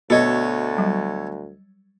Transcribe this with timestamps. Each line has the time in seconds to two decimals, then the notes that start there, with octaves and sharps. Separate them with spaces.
0.10 D2 B2 A4 C#5 D#5
0.78 F#3 G3